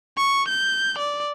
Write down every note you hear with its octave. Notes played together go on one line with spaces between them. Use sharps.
C#6
G6
D5